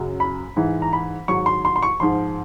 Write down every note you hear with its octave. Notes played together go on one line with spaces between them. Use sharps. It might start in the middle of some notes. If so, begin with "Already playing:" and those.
Already playing: F#2 C#3 F#3
B5
G#2 E3
A#5
B5
G#2 D#3 F#3 C#6
C6
C6
C6
C#6
G#2 F3 C6